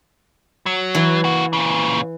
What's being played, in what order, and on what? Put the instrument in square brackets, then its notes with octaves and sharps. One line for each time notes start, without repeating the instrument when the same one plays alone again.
[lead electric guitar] F#3
[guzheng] E3
[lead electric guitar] A#3 F#4
A#2 C#3